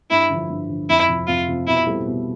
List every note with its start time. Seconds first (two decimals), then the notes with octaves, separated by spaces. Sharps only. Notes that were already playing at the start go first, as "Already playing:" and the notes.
0.10 G2 E4
0.30 D3 F3
0.50 G2
0.69 D3 F3
0.89 F2 E4
1.08 C3 F3
1.27 F2 F4
1.47 C3 F3
1.67 B2 E4
1.87 G3 C4 E4 A4
2.06 B2